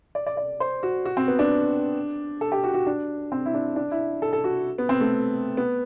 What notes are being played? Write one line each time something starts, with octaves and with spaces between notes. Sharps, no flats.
D5
D5
D5
C5
F#4
F#4
C4
B3
D4
A4
G4
F#4
F#4
D4
C4
E4
D4
D4
E4
A4
A4
F#4
B3
C4
A3
B3